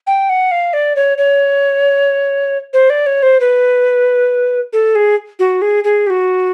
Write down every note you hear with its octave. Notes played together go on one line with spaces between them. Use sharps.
G5
F#5
F5
D5
C#5
C#5
C5
D5
C#5
C5
B4
A4
G#4
F#4
G#4
G#4
G4
F#4